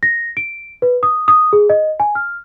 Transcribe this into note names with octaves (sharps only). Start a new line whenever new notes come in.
A#6
D7
B4
D#6
D#6
G#4
D#5
G#5
F6